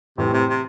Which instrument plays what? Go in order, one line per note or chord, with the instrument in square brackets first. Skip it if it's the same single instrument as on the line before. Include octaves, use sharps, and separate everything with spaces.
[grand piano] A2 E3 G3 C4 [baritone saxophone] C3
[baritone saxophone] C3
C3